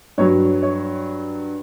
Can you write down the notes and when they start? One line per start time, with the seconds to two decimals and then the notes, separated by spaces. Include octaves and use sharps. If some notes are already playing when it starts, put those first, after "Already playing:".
0.18 G2 F#3 C#5
0.63 C#5